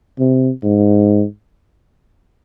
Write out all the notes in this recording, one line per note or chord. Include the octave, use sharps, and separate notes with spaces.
C3
G#2